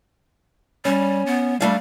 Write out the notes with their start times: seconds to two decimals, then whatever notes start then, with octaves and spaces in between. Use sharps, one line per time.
0.85 G3 C#4
1.26 B3
1.61 G3 A3 D4 F5